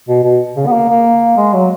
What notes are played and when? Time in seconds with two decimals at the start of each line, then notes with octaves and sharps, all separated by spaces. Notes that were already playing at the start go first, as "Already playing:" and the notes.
0.08 B2
0.24 B2
0.56 C#3
0.67 B3
0.72 A#3
0.89 A#3
1.37 G#3
1.53 F#3